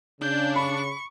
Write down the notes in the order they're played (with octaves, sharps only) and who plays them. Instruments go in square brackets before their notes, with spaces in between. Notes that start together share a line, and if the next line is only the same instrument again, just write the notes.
[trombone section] C#3 [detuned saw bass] D4 [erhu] G6
[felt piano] B5 [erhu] C#6